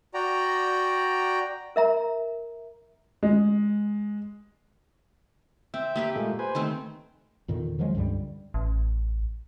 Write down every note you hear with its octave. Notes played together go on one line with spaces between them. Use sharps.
F#4 D5 G5 A#5
A#4 E5 A#5
G#3
C4 E5 G5
A#3 G4 B4
A#2 G#3 A3
B4 C5 G#5
D#3 A3 C4
E2 A#2 D3 D#3
D#3 F3 F#3 G#3
C#2 G2 D3 G3
A1